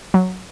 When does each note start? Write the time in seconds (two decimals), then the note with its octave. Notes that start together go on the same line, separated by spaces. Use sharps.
0.14 F#3